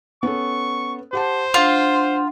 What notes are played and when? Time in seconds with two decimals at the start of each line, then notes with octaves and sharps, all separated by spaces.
0.23 B3 C#4 A4 C#6
1.13 G4 C5 F#5 A5
1.54 D4 F4 F#5 F6